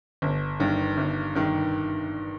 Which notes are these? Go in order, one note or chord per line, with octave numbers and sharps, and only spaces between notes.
G1
G2 D#3
G1
G2 D#3